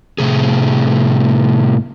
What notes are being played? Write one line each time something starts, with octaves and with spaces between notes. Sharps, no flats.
A2 C3 G#4